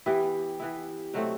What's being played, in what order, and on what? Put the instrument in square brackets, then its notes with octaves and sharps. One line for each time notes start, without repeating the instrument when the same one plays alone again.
[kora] E3 B3 E4 [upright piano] G4
[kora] E3 B3 E4
B2 F#3 A3 C4